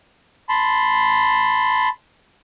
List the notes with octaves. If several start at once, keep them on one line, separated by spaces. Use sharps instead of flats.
A5 B5 C6